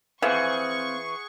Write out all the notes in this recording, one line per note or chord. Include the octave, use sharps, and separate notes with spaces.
E3 C4 G#4 C5 F5 F#5 C#6